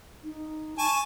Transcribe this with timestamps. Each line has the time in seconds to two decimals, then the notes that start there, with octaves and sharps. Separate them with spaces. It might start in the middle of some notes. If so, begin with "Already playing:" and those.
0.24 D#4
0.79 G#5 A5 C#6